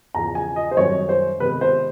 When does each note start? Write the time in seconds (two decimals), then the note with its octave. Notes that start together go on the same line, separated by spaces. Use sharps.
0.15 E2 C#3 F3 A#5
0.35 G#5
0.56 D#5
0.71 C5
0.77 F#2 D#3 G3 C4 C#5
1.09 C5
1.40 C3 D#3 G#3 B3 B4
1.61 C5